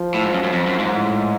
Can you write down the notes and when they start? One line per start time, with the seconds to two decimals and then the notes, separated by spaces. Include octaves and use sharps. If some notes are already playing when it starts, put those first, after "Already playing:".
Already playing: F3
0.14 A2
0.24 G#2
0.34 F#2
0.44 F#2
0.53 F2
0.67 F#2
0.79 G#2
0.93 A2